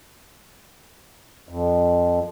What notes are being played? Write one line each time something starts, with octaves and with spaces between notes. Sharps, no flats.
F2